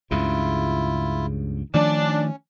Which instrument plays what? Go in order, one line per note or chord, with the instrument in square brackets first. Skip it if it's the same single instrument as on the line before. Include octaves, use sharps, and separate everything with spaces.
[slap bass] C#2 G2 C#3 [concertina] E4 F4
[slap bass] D#3 F3 A3 [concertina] C#4 [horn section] D4